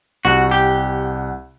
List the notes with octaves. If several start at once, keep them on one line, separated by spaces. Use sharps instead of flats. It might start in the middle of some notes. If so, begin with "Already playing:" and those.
C2 F#4 F#5
G4